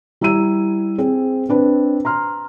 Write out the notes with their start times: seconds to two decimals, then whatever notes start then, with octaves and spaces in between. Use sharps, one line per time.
0.21 G3 E4 A#5 E6 D#7
0.98 C4 G#4 C5
1.49 C4 D4 B4
2.05 A#5 C6 F6